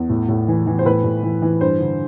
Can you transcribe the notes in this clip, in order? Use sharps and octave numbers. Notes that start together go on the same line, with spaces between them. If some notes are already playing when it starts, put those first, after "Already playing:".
Already playing: E2
A2
A2
E3
E3
C5
A2 B4
A2
E3
E3
G2 C5
D3